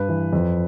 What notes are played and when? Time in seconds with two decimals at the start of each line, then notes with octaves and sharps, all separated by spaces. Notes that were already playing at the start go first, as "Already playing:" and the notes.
Already playing: G2 B4
0.09 E3
0.33 F2